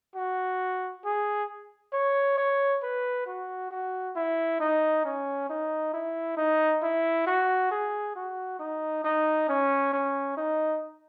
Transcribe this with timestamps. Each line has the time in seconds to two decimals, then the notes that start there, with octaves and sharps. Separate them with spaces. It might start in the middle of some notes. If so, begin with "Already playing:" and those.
0.16 F#4
1.05 G#4
1.93 C#5
2.38 C#5
2.83 B4
3.26 F#4
3.71 F#4
4.16 E4
4.60 D#4
5.05 C#4
5.49 D#4
5.93 E4
6.37 D#4
6.82 E4
7.27 F#4
7.71 G#4
8.16 F#4
8.59 D#4
9.04 D#4
9.49 C#4
9.93 C#4
10.37 D#4